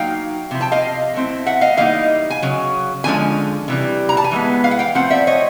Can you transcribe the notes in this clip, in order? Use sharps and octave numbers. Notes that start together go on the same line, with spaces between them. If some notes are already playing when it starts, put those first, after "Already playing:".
Already playing: F#3 A#3 D#4 F5 G5
C3 F3 E4
G5 A5
D#5 F5
D3 F#3 A3 C4 E4
E5 F#5
D#5 F5
E3 G3 A#3 D#4 D#5 F5
G#5
C#3 F#3
D3 F3 G#3 C#4 G#5
C3 E3 G3
A#5
A5
G#5
E3 G#3 B3
F5
F#5
F5 G5
F3 A3 C4 F#5
D5 E5
C#5 D#5